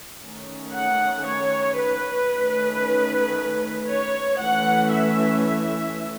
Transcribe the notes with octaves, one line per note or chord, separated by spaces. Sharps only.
D#3 A3 C#4
F#5
C#5
B4
D#3 A3 C#4
C#5
E3 A3 C#4 F#5
E5
E5